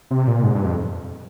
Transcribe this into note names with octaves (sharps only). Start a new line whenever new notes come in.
C3
A#2
G#2
G2
F2